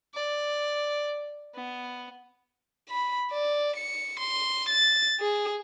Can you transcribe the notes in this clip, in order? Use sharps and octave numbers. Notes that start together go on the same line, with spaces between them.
D5
B3
B5
D5
C#7
C6
A6
G#4